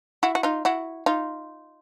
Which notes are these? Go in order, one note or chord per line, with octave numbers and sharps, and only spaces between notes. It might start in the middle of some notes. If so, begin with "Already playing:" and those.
E4 F#4
F#4
D#4 F4
E4 F#4
D#4 F4